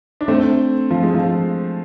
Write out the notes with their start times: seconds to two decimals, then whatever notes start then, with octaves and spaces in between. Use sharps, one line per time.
0.21 D4
0.28 A3 C4
0.90 F3
1.03 G#3
1.14 F3